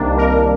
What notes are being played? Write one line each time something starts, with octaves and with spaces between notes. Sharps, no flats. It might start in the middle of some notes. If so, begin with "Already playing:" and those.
Already playing: C2 C3 D#3 A#3 D4
A#4